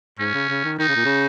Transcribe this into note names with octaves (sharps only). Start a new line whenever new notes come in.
G#2 C#4
C#3
C#3
D#3
D#3 D#4
C#3
A#2
C#3